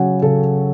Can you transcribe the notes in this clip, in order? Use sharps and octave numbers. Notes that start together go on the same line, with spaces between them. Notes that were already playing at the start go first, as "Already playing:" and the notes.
Already playing: C#3 F#3 C#4 F#5 G#5
C#3 A4